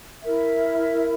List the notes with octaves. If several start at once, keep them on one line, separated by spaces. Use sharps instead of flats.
E4 A#4 E5